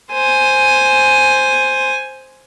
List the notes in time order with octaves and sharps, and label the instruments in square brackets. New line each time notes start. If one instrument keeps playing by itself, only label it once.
[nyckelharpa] C5 G#5